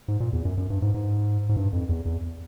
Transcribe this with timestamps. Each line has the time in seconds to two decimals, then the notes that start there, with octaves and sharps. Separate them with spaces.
0.08 G#2
0.20 A#2
0.33 E2
0.45 F#2
0.58 F#2
0.70 G2
0.82 G#2
0.94 G#2
1.49 G#2
1.56 G2
1.73 F2
1.89 E2
2.05 E2